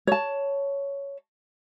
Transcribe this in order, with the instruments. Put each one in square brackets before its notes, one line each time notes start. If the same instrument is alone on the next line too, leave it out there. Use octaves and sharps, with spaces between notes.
[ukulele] C#5 A5